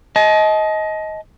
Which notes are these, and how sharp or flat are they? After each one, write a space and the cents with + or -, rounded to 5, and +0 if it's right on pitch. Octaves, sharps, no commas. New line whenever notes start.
D#5 +20 A5 -35